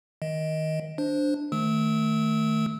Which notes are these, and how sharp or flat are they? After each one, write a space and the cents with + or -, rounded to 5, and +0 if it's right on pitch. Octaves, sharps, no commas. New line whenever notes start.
D#3 +15 D#5 +15
D4 +0 C5 +0
D#3 +0 A3 +0 E6 -30